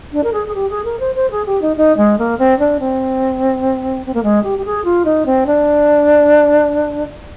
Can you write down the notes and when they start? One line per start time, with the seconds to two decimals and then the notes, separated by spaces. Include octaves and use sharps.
0.12 D4
0.23 A#4
0.33 G#4
0.47 G#4
0.54 G4
0.69 G#4
0.84 A#4
1.00 C5
1.15 C5
1.31 G#4
1.46 G4
1.62 D#4
1.76 D#4
1.97 G#3
2.18 A#3
2.39 C4
2.59 D4
2.80 C4
4.06 C4
4.14 A#3
4.23 G#3
4.43 G4
4.58 G4
4.65 G#4
4.84 F4
5.05 D#4
5.26 C4
5.46 D4